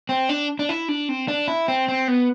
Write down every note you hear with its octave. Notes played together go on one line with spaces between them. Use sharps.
C4
D4
D4
E4
D4
C4
D4
E4
C4
C4
B3